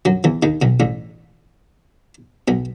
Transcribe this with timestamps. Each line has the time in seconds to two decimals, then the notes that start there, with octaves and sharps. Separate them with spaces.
0.05 F#2 F#3
0.24 E2 E3
0.43 D#2 D#3
0.62 B1 B2
0.80 A1 A2
2.48 B1 B2